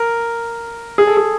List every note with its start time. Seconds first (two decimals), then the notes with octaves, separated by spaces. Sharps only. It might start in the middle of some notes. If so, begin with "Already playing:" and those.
Already playing: A#4
0.98 G#4
1.07 A4
1.17 G#4